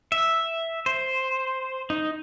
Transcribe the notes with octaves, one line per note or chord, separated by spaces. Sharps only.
E5
C5
D#4